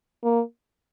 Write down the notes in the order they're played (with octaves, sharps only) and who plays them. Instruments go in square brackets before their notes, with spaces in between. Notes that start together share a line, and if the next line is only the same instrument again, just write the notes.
[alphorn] A#3